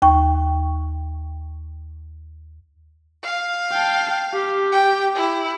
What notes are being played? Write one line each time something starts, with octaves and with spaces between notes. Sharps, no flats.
D#2 G5 C#6
F5
G5 A5
G4
G5
E4